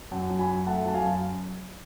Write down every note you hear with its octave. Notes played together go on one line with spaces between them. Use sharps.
F#2 F#5 A5
F#3
G#5 B5
F#2
A3 F#5 A5
F#3 A5
F5 G#5
F#2